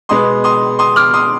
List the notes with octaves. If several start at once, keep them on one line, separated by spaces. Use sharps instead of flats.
B2 G#3 B3 C6 D#6
C6 D#6
C6 D#6
D6 F6
C6 D#6